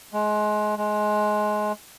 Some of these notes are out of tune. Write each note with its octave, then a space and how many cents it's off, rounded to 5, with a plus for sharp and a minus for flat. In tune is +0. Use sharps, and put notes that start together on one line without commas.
G#3 +25
G#3 +20